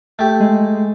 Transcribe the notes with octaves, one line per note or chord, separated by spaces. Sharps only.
A3 G4
G#3